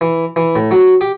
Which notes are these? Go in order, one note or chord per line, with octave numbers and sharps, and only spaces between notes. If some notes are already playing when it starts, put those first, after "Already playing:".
E3
E3
A2
F#3
G4